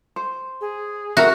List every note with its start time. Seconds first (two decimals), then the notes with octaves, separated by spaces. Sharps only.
0.16 C5
0.61 G#4
1.17 F#4 A#4 E5